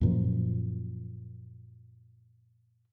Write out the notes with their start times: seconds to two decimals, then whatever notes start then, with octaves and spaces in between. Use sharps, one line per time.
0.01 F#2 A#2 F3